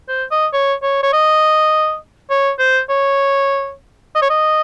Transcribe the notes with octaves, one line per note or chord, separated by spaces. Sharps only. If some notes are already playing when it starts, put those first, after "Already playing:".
C5
D#5
C#5
C#5
C#5
D#5
C#5
C5
C#5
D#5
C#5
D#5